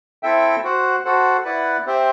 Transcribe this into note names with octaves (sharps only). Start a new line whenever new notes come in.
C4 E4 A4 E5 G5
F#4 C5 F#5
F#4 A4 C5 F#5
E4 B4 D5 F#5
C4 G4 C5 E5 G5